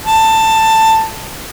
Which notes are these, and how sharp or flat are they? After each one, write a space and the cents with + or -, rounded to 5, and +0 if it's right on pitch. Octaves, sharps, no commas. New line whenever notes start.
A5 +15